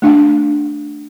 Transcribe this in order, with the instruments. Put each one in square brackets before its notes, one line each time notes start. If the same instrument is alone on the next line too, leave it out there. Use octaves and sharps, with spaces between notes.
[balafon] A3 D4 F5